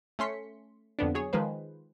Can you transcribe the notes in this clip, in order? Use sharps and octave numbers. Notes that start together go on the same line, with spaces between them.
A3 C#4 C6 B6 C#7
F2 D3 B3 D4
F#3 G#4 C#5
D#3 F3 G#3 B4 C5